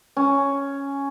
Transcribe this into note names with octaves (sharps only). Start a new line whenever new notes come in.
C#4